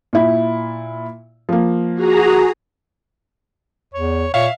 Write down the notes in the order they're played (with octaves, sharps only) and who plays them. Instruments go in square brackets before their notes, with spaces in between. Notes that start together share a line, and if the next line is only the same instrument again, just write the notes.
[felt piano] A#2 E4
F3 A#3
[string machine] F#4 G#4 A#5
[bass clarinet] E2 [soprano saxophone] C#5
[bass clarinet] A#2 [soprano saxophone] C#5 [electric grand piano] E5 F5